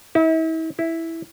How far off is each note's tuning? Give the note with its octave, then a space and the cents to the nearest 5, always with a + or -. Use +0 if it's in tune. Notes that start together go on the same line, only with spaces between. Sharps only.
E4 -40
E4 -5